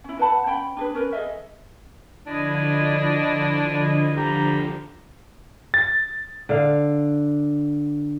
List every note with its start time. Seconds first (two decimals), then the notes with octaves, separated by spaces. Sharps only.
0.04 C#4 E4
0.19 B4 F#5 A5 B5
0.46 C#4 G5 B5
0.76 D4 G#4 B4
0.94 C#4 A#4 B4
1.13 G#4 A4 D#5 E5
2.27 D3 F3 D4 E4 D#5
4.17 G3 A#5
5.74 A6
6.49 D3 F5